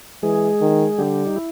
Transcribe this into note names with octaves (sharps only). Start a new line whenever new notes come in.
E3 G#3 G#4
D#3
D3 G3 G4
D#4
E4